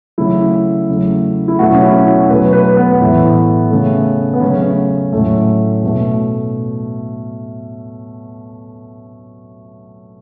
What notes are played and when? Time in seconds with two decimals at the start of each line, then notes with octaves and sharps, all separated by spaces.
0.18 C#3 F#3 A3 E4
0.89 C#3 F#3 A3
1.48 E4
1.59 B2 F#3 A3 F#4
1.74 C#4
1.83 E4
2.07 F#4
2.29 B2 F#3 A3 B4
2.53 B4
2.77 B3
3.01 A2 E3 A3
3.71 C#3 A3
4.34 B3
4.41 C#3 F#3 A3 C#4
5.13 A2 F#3 A3
5.83 B2 A3